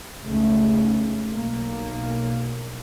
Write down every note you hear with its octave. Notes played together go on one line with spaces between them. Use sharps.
F1 C#2 G#2 C#3 A3
B1 A#3